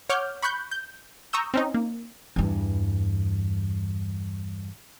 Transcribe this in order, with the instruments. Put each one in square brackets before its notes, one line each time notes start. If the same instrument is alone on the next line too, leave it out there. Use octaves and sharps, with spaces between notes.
[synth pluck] C#5 F#5 D6 F6 G6
B5 C#6 F#6 G6
G6
A#5 C#6 D#6 E6 G6
C4 C#4 D#4
A#3
[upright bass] E2 G2